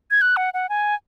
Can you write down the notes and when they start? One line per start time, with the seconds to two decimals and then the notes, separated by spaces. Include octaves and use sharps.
0.11 G#6
0.21 F#6
0.37 F#5
0.54 F#5
0.69 G#5